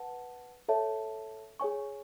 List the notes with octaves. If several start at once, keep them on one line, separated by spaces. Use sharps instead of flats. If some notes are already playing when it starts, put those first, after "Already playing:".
Already playing: B4 F#5 A5
A4 C#5 E5 A5
G#4 C#5 G#5 C#6